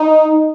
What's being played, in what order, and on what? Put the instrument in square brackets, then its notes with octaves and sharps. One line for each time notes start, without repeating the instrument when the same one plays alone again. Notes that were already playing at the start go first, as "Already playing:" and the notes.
Already playing: [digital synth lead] D#4